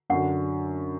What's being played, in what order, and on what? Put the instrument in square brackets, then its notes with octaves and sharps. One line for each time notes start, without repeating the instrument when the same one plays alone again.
[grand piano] F#2 D3 F#3 [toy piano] F#5